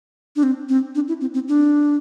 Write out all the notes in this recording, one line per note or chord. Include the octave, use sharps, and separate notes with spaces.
D4
C4
C4
D4
E4
C4
C4
D4